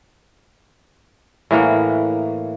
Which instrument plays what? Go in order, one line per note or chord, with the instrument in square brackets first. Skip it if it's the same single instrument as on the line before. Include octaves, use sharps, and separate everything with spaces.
[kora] A2 E3 A#3 F#5